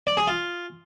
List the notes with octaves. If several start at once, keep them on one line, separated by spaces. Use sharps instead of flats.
D5
G#4
F4